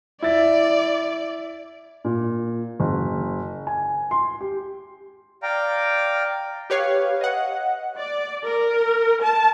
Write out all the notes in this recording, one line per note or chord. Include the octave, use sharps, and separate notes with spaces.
E4 D5 A6
A#2
F#1
G#5
C6
G4
D5 F5 G5 A#5
G4 B4 C#5 F5
D#5 F#5
D5
A#4
A5